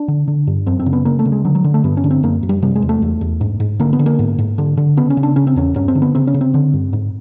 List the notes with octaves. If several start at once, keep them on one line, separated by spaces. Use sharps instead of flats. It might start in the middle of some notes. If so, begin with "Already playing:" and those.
Already playing: D4
D3
D3
G2
F#2 C4
C4
C#3
B3
C#3 A#3
A3
C#3
G#3
D3 F#3
F#3
D3
A3
G2 B3
C#4
D3
C4
F#2 A#3
F#2
G3
C3 G3
G#3
E2
A3
E2
E2
G#2
G#2
D3 A#3
B3
D3
A#3
G#2
G#2
D3
D3
C#3 B3
C#4
C#3
D4
C#3 C#4
C4
E2 C#4
G2 C#4
C4
D3
B3
C#3 C4
C#4
C#3
C4
D3
G2
G#2